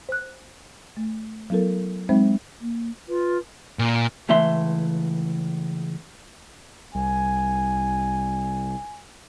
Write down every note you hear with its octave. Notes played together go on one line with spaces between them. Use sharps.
C5 F#6
A3
F#3 B3 E4 A4 A#4
F#3 G#3 C4 D#4 C5 E5
A#3
F4 B4
A#2
C#2 E3 A3 E5 C6
C2 G#5